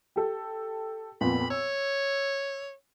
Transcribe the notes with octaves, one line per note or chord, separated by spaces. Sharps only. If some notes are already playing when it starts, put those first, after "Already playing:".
G4 A4
F2 A#2 B3 B5
C#5 E6